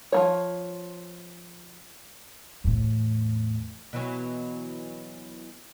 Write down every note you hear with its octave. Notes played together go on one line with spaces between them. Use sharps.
F3 A#3 C#5
E2 A2
B2 E3 F#3